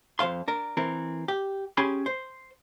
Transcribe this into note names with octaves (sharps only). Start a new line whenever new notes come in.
F2 C#3 C5 F5 C6
D4 A#4
E3 C4 A#4
G4
C#4 G4 G#4 G#5 B5 C6
C5